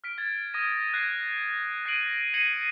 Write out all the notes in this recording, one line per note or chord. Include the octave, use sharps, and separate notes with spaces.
F6 B6 D7
G#6 A6
D#6 G#6 A#6 D#7
F#6 G#6 A#6 C7
F#6 A#6 C7 D7 D#7 F#7
G#6 A#6 C7 C#7 D#7 F#7